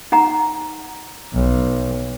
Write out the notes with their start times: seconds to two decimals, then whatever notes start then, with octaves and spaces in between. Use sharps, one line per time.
0.12 D#4 F#5 A#5
1.34 B1